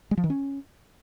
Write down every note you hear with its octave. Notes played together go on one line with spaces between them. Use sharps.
G#3
F3
D#3
C#4